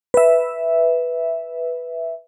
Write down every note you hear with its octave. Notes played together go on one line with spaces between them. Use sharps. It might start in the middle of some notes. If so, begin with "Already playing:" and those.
B4 E5